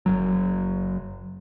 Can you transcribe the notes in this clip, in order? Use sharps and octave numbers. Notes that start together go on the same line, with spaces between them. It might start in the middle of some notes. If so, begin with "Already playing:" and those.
F#1 F#3